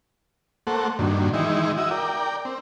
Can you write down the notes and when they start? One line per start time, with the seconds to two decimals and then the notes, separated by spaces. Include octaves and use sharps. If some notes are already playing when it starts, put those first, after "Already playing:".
0.67 A3 A#3 A4 C5 F#5
0.99 G2 A#2 D#3 F#3 D4
1.34 D#3 E3 G#3 D#4 E4
1.77 E4 F#4 E5 D#6
1.91 A#4 D5 G5
2.45 C4